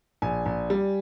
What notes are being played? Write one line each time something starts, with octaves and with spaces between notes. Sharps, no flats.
A#1 G#5
A#1
G3